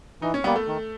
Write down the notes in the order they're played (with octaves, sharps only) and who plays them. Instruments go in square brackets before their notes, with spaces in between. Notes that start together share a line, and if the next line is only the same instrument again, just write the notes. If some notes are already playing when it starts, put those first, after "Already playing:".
[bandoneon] E3 [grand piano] D#4
[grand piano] C#4
[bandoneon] G3 A#3 [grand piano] B3
[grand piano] A3
[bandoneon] D#3